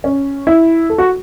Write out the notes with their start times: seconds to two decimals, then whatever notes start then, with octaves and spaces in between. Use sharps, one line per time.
0.04 C#4
0.47 E4
0.90 A4
0.98 F#4